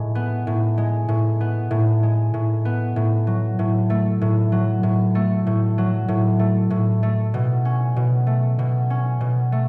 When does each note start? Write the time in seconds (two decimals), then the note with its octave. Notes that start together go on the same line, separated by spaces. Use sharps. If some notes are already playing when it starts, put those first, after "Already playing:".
Already playing: A2 G#3
0.15 B3
0.47 A2
0.78 G#3
1.08 A2
1.41 B3
1.71 A2
2.03 G#3
2.34 A2
2.65 B3
2.96 A2
3.27 F#3
3.59 A2
3.90 A3
4.21 A2
4.52 F#3
4.83 A2
5.15 A3
5.46 A2
5.78 F#3
6.08 A2
6.39 A3
6.70 A2
7.03 A3
7.34 B2
7.65 C#4
7.96 B2
8.27 A3
8.59 B2
8.90 C#4
9.21 B2
9.52 A3